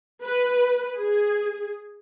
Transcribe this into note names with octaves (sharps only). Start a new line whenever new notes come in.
B4
G#4